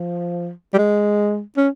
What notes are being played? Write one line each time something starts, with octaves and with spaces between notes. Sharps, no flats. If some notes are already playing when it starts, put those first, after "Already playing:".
Already playing: F3
G3
G#3
C#4